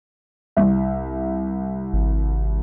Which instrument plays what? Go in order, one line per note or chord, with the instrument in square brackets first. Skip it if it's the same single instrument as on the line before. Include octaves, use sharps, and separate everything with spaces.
[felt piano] C2 E5
[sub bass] G#1